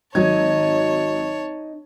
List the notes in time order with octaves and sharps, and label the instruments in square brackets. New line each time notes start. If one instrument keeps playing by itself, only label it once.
[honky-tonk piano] G#1 F#3 G#6 [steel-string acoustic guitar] D#4 [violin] C#5 A5